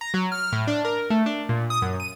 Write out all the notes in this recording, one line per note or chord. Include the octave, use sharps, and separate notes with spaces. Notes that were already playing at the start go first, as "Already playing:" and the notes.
A#5
F#3
F6
A2
D4
A#4
A3
D4
A#2
D#6
F#2
D#7